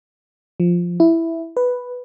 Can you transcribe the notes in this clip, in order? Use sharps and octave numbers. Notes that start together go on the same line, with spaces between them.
F3
E4
B4